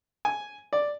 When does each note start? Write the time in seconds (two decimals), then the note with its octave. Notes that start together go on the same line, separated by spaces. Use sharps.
0.25 G#5
0.73 D5